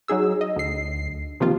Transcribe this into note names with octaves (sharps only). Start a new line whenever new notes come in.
F#3 D#4 G#4 E6
D#5
D2 C7
C3 D#3 F3 A#3 F4